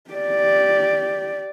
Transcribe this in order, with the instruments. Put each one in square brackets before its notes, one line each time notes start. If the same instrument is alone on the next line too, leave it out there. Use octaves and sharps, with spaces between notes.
[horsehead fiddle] G4 D5